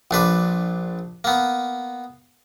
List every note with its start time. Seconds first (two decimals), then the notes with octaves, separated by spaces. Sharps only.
0.11 A#1 D4 B4 D6
1.24 A#3 B3